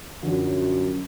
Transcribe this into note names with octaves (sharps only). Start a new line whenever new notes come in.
F#2 D3 F3